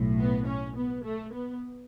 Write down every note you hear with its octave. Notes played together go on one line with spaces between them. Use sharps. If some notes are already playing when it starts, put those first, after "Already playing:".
Already playing: B1 A2
B3
C#4
B3
A3
B3